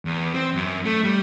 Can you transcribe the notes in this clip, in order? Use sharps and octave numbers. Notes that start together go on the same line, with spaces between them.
E2
C4
F#2
A3
G3